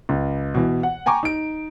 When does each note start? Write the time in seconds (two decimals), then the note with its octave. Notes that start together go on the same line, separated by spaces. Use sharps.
0.09 C#2
0.54 B2 E3
0.83 F#5
1.06 G5 G#5 A#5 C#6 D6
1.23 D#4 D7